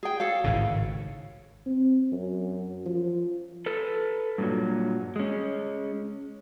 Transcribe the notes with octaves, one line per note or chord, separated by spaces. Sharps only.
G#4 G5
A4 C#5 F5
G#1 A2 C#3
C4
F#2
F3
A4 B4
G2 A#2 F#3
G#3 C#4